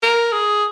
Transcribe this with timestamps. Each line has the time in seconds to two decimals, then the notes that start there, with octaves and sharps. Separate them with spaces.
0.03 A#4
0.32 G#4